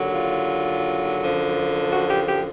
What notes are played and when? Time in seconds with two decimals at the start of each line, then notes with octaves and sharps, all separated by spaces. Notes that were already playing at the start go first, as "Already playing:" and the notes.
Already playing: D#2 D3 F#3
0.13 F4
1.21 F#2 D3 F3
1.92 F#4
2.09 G4
2.28 G4